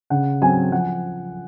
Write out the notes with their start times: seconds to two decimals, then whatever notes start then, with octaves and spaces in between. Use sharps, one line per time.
0.10 C#3 F#5
0.42 F#3 C4 G#5
0.72 F3 F#5